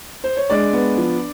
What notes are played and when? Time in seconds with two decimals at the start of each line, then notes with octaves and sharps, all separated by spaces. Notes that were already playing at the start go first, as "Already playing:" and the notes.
0.24 C5
0.37 C#5
0.50 G#3 D4 D5
0.73 B3
0.97 F3